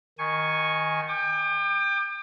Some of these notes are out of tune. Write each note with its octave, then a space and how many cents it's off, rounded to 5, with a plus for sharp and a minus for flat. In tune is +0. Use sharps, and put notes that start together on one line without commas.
D#3 +0 G#5 +0 C#6 +0
G5 +20 D6 +35